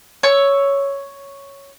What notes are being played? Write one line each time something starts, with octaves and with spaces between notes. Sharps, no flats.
C#5 E6